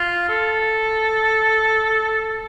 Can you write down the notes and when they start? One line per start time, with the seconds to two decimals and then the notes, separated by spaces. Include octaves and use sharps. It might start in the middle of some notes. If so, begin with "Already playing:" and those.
Already playing: F4
0.29 A4